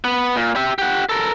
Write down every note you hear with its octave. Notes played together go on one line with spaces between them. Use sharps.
B3
A#2
G4 E5
G4 F#5
A4 A#4